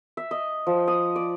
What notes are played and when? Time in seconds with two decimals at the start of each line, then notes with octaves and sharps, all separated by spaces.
0.17 E5
0.31 D#5
0.67 F3
0.88 D#6
1.16 D5